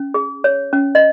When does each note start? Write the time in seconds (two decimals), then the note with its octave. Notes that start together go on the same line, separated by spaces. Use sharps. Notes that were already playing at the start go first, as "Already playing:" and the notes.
Already playing: C#4
0.14 G#4
0.44 C#5
0.73 C#4
0.95 D#5